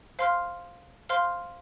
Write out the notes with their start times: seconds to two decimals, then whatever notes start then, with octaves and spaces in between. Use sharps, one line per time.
0.19 C5 F5 C6 F6
1.09 C5 F5 C6 F6